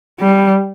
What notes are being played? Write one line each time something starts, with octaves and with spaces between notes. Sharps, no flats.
G3